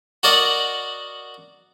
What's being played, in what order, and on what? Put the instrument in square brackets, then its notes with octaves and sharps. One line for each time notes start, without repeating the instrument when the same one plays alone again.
[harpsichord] F#4 A#4 D5 D#5 F#5